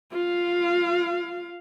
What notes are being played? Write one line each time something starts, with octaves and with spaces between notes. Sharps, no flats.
F4 F5